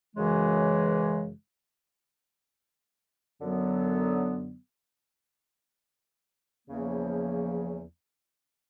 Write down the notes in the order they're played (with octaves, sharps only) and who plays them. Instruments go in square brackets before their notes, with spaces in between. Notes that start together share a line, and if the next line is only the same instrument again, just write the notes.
[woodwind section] F#2 C#3 E3 G#3
F#2 D3 F#3 B3
E2 C#3 F3 A#3